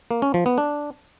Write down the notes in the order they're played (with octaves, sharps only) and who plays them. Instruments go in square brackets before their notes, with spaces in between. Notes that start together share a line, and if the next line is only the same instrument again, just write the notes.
[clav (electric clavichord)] A#3
C#4
F3
B3
D4